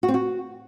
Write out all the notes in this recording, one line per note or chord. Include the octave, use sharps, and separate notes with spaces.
F#4
C4
F#4